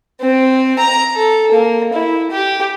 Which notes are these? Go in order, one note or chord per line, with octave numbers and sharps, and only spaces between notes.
C4
A#5
A4
A#3
E4
G4